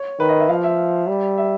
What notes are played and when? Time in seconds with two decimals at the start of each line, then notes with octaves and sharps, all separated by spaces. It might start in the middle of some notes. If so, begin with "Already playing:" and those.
Already playing: C#5
0.19 D#3 B4
0.29 D#5
0.40 E5
0.49 F3 F5
0.64 E5
1.07 G3
1.38 E5